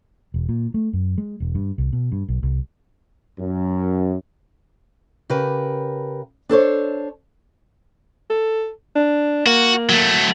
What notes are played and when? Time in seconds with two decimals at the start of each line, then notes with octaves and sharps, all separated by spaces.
0.34 E1
0.49 A#2
0.74 A3
0.93 F#2
1.18 G#3
1.40 E1
1.55 G2
1.78 C2
1.93 B2
2.12 G2
2.28 B1
2.43 C2
3.39 F#2
5.30 C#3 G4 A#4 B4
6.49 D4 A4 C5 C#5
8.30 A4
8.96 D4
9.46 A#3 F#4
9.89 F#3 A3